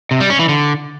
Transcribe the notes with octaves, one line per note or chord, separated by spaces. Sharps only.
C3
G3
C#4
E3
D3